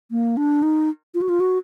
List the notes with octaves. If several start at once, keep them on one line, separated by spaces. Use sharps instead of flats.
A#3
D4
D#4
F4
F#4
F4
F#4